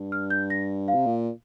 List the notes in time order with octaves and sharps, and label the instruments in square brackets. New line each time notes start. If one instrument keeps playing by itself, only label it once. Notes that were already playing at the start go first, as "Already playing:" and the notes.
Already playing: [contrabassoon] G2
[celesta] F6
G6
A#6
F5
[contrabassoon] C3
A#2